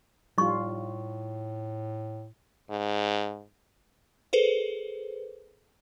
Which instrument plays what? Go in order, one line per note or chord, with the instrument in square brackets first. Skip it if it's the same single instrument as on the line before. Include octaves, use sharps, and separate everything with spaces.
[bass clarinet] A2 [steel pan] G3 F4 [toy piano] D#4 C#6
[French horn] G#2
[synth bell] G#4 A4 B4 C5